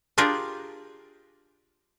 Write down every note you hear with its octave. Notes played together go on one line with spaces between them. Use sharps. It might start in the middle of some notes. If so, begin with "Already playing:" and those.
D4 F4 G4 G#4 A#4